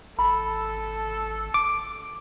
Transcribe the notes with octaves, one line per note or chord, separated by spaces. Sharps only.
G#1 A4 B5
D6